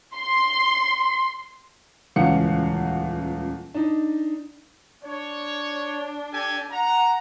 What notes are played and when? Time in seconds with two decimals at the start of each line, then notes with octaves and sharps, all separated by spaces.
0.16 C6
2.16 D#1 C#2 E3 F5 F#5 C#7
3.74 D4 D#4
5.04 D4 C#5
6.33 G4 A4 G#5
6.72 F#5 A#5